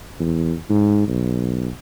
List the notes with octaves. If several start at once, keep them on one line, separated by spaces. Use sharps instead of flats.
E2
G#2
B1